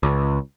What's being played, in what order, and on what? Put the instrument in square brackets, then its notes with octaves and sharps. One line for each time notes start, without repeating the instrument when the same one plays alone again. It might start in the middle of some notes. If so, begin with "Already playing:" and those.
[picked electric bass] C#2